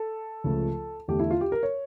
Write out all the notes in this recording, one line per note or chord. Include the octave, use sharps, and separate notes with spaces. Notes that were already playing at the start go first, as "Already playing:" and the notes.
Already playing: A4
C#2 C#3 F3 A3
E2 D3 A3 G4
E4
F4
G4
A#4
C#5